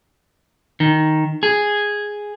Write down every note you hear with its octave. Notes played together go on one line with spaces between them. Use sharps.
D#3
G#4